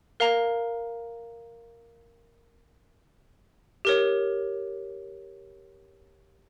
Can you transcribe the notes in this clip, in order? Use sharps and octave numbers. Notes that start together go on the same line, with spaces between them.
A#4 F5 A#5
G4 A#4 C#5